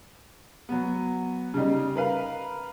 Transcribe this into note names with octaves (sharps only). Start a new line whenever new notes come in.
F#3 B3
C#3 G3 D#4
A#4 B4 F5